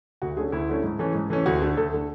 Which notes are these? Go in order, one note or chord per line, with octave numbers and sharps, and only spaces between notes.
D2 F#4
D3 A3 C#4 G#4
D2 E4
D3 A3 C#4
G#2
E3 A3 C#4
G#2
E3 A3 C#4
D2 F#4
D3 A3
D2 A4
D3 A3